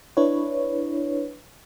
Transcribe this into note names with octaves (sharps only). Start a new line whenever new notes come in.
D4 E4 B4 C#5